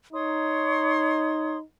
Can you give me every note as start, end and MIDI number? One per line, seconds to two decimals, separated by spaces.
0.13 1.62 63
0.13 1.58 73
0.13 1.58 84
0.13 1.58 87